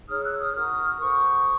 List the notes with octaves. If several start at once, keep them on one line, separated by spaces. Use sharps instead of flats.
D#4 G#4 C#5 D#6 F6
E6 F#6
D#6 F6
D#4 F#4 A#4 D#6 F6
F#4 A4 C5 C#6 D#6